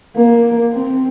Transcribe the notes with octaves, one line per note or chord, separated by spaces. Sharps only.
A#3
C4